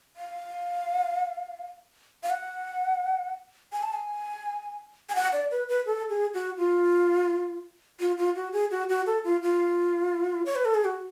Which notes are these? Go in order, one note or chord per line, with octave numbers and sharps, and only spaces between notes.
F5
F5
F#5
G#5
A5
G#5
G#5
F#5
D5
B4
B4
A4
G#4
F#4
F4
F4
F4
F#4
G#4
F#4
F#4
A4
F4
F4
C#5
B4
A4
G#4
F#4